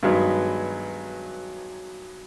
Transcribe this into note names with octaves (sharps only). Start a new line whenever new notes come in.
G2 D#3 F#3 G#3 B3